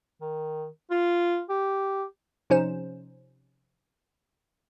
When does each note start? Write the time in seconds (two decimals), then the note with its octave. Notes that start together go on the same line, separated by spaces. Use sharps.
0.21 D#3
0.91 F4
1.49 G4
2.50 C3 F3 C#4 D#4 C5 E7